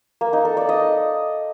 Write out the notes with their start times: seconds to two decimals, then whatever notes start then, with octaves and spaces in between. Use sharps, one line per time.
0.21 A#3
0.33 D#4
0.45 A4
0.57 D5
0.69 D#5